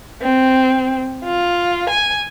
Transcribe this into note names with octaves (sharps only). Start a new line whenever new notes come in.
C4
F4
G#5